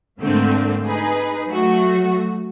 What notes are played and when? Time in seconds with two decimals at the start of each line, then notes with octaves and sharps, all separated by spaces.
0.20 G#2 D3 A3 A#3 C4
0.87 D#4 G#4 B4
1.47 F#3 A3 F#4